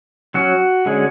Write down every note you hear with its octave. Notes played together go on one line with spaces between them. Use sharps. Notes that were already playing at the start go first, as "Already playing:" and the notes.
F#3 C#4 F#4
D3 G#3 C#4